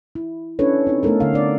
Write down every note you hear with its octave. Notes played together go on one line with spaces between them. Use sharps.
E4
C#4 D4 E4 A4 B4 C#5
C4 D#4
A3 B3 D#4 A4 A#4
D3 F5
D4 D5